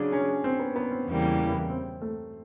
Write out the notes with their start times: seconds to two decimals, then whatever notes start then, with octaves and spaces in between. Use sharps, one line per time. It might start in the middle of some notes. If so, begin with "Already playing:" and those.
Already playing: C#3 F#3 D4
0.12 C#4
0.44 C4
0.59 B3
0.76 B3
0.91 C4
1.07 E2 C#3 E3 G3 A#3
1.70 C4
2.02 A3